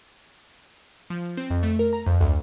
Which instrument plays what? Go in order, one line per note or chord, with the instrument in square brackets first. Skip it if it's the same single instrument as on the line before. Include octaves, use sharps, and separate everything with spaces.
[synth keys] F3
C4
F2
A3
A#4
A#5
F2
D2